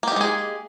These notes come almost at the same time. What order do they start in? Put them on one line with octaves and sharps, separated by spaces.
A#3 G4 D#4 G#3 G#4